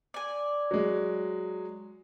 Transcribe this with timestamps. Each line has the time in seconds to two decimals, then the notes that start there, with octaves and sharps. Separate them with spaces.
0.14 D5 G#5
0.71 F#3 G#3